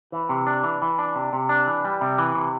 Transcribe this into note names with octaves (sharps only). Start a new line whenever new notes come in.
E3
C3
D4
E3
E3
D4
C3
C3
D4
E3
G3
C3
E3
C3